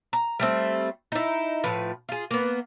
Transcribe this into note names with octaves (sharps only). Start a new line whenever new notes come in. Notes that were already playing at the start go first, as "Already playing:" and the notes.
A#5
G3 A3 C4
D#4 E4
A2 F3 B4
F4 G#4
A#3 B3